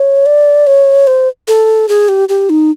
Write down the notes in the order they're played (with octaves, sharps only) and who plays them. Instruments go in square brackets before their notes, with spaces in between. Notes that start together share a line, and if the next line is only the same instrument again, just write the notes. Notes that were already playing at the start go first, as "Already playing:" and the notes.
Already playing: [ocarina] C#5
D5
C#5
C5
A4
G#4
G4
G4
D#4